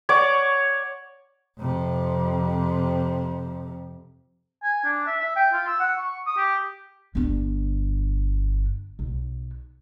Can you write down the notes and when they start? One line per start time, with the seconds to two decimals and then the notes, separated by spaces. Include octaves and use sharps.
0.09 C#5 D5 F#5 D6
1.59 F2 C3
4.64 G#5
4.85 D4
5.07 E5
5.21 E5
5.36 G5
5.53 F4
5.67 E6
5.80 F#5
5.98 C#6
6.26 D#6
6.38 G4
7.15 G1 D4
8.99 B1